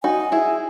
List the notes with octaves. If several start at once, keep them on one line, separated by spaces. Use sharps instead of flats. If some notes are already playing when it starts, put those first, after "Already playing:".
D#4 F#4 G#5
E4 G#4